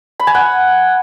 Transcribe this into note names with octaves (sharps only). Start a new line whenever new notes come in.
B5
G#5
F#5